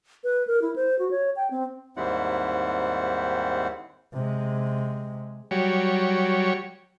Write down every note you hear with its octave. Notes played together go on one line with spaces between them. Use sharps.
B4
A#4
E4
C5
F#4
C#5
G5
C4
D#2 G#2 G3 C4 E4 F#5
C3 G#3
F#3 G3 C#5